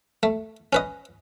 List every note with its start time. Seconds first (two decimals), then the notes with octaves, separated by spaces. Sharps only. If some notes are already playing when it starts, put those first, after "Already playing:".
0.23 A3
0.73 C#4 B4 D#5